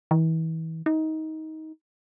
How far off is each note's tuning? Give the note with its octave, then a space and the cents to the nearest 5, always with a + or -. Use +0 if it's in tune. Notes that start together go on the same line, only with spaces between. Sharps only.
E3 -35
D#4 +20